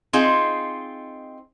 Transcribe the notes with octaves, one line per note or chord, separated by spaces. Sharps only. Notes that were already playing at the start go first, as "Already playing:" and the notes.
C4 D#4 F4 G#4